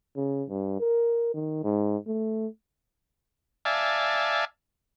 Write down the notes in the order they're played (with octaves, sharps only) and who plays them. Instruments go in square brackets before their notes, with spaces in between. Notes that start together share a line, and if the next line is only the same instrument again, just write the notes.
[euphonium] C#3
G2
A#4
D#3
G#2
A3
[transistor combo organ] D5 E5 F5 G#5 A5